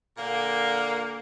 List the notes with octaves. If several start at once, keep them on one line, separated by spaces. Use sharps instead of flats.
A#2 D3 A#3